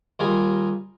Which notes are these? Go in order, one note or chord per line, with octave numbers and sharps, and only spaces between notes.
D#2 G3 F4 G#4 A#4 G5